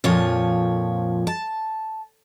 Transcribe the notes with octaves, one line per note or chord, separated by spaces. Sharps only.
F2 A#2 F3 C#5
A5